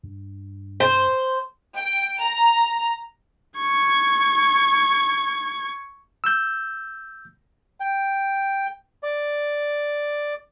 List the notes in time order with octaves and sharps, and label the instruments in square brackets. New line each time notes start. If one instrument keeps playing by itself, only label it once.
[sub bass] G2
[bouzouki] C5
[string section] G5
A#5
[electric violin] C#6 G#6
[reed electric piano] E6 G6
[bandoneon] G5
D5